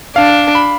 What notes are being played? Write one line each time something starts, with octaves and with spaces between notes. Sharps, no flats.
D4 F5
B5